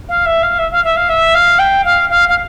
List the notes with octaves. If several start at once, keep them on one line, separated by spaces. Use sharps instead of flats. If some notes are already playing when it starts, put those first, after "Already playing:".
F5
E5
F5
E5
F5
E5
F5
E5
F5
G5
F5
F5
F5